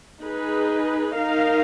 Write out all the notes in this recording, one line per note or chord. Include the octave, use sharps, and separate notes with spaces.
D#4 G#4 B4
D#4 A#4 F5